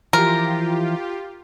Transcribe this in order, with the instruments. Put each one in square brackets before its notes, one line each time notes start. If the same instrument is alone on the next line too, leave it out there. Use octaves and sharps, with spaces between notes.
[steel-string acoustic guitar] E3 F3 [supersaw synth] F4 G4 [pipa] A#4